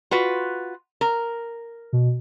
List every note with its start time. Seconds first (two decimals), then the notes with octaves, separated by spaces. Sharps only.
0.11 F4 F#4 B4
1.01 A#4
1.93 B2